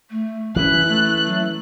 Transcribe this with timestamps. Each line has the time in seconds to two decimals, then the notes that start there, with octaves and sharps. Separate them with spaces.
0.10 A3
0.56 E3 C#4 E4 F#6
0.89 A3
1.26 F#3